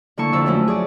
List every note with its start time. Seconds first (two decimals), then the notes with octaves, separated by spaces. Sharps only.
0.17 D3 A#3 E4 A5 C#6
0.33 F2 D3 E6
0.46 F#2 F3 A3 C#4
0.68 G#4 D5